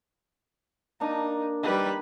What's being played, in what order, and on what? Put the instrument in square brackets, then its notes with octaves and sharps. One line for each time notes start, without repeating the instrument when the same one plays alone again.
[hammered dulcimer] A#3 D4 [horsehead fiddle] D#4
[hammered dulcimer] D#3 [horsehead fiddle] G3 B4